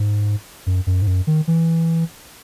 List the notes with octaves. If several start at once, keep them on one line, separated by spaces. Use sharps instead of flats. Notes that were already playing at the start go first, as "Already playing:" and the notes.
Already playing: G#2
F#2
F#2
G#2
F#2
D#3
E3